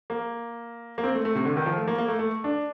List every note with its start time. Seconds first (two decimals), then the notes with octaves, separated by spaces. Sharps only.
0.10 A#3
0.98 A#3
1.03 C4
1.15 A3
1.25 A3
1.35 C3
1.45 D3
1.57 D#3
1.66 F3
1.76 A3
1.87 A#3
1.98 A#3
2.08 A3
2.19 A3
2.44 D4